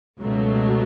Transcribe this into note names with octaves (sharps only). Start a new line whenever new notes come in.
C#2 B2 F#3 A3